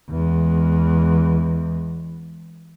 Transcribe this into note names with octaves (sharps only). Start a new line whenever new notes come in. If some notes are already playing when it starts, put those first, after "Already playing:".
E2 G#3